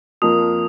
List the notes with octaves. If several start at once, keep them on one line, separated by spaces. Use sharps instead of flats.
F2 F3 A#3 D#6